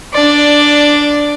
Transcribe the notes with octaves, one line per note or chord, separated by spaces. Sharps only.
D4 D5